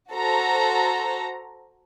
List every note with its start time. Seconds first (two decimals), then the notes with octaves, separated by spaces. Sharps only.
0.12 F#4 A4 C5 A#5